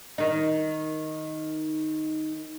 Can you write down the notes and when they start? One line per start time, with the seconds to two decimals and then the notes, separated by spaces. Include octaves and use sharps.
0.18 D#3 D#4